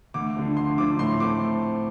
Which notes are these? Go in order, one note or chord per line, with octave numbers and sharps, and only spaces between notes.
D2 D6
D3 F3
D2 C6
D3 F3 D6
A2 C6
A3 C4 D6